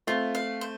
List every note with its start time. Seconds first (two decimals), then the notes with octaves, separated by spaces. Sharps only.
0.07 A3 C4 F4
0.35 F5
0.61 C5